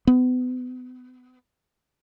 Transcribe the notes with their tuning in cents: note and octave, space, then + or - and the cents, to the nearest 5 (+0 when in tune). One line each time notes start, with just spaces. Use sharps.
B3 +35